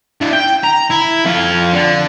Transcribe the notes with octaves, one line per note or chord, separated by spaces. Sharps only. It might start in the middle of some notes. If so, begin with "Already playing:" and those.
D4 E4
G5
A#5
E4
F2 F4
D3